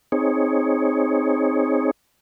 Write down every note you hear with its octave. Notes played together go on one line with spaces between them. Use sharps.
C4 D#4 G#4 C#5